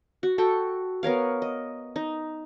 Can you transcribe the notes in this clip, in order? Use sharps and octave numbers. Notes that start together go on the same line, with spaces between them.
F#4
F#4 A4 G5
B3 A#4 C#5 F5
D#5
D#4